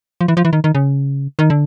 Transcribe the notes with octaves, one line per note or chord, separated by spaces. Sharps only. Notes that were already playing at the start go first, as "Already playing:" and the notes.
F3
E3
F3
E3
D#3
D#3
C#3
D#3
D3